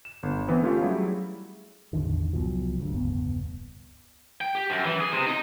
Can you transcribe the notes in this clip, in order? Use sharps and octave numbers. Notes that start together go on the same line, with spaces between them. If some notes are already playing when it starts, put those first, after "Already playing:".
E7
G1
E3 B3 C4
A3 C#4 E4 F4 G4 F5
F#3 G3 A3 E4 G#4
A1 E2 D3 D#3
C2 B2 F3 F#3
D2 G2
E1 C#2 G2 B3
G5
G4
F#2
E3
G#4
C3
D#4